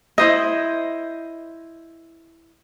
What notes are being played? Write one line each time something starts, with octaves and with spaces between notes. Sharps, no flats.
E4 C5 D#5